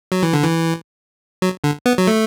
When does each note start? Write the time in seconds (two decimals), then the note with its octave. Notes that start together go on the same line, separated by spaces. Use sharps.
0.12 F#3
0.23 E3
0.33 D3
0.43 E3
1.42 F#3
1.64 D3
1.86 B3
1.98 F#3
2.07 A3